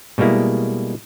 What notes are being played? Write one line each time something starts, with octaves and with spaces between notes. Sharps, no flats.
B2 G3 G#3 A#3 E4